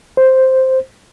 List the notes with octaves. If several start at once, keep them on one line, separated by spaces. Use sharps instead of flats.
C5